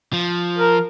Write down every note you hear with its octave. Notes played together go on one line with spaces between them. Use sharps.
F3
A#4